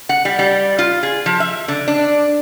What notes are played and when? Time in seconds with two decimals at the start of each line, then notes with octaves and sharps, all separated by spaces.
0.09 F#5
0.25 G3
0.39 G3
0.78 F4
1.03 G#4
1.26 F3
1.40 E5
1.68 D3
1.88 D4